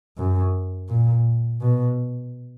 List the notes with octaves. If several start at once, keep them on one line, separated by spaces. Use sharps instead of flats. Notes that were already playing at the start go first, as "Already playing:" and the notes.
F#2
A#2
B2